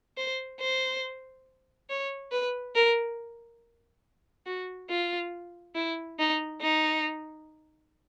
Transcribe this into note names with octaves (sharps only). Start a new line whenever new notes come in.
C5
C5
C#5
B4
A#4
F#4
F4
E4
D#4
D#4